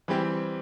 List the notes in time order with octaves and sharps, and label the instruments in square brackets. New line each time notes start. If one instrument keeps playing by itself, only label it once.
[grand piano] E3 G3 C4 G4